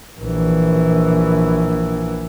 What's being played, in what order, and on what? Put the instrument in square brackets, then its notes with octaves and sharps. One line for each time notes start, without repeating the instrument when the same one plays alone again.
[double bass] A#1 E3